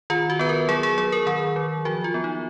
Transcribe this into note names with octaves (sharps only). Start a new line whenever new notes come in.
D#3 F4
F#4
B3 B4
A#4
F#3 G#4
G#4
F#3 G#4
A#4
D#3 G#4
F#3
F3 F#4
F4
B3
D#4